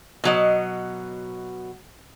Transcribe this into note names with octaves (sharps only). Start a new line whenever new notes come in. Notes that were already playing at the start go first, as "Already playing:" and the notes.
B2 F#3 D#5